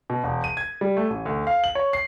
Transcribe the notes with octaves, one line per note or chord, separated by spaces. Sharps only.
B2
E1
D#7
G#6
G3
A3
A1
D2
F5
F#7
C#5
C7